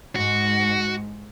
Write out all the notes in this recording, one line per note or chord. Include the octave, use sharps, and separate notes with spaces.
G#2 F#4